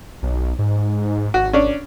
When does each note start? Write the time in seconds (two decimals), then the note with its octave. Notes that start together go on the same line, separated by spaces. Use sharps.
0.23 B1
0.59 G#2
1.34 G#1 F#4
1.53 C#4 D4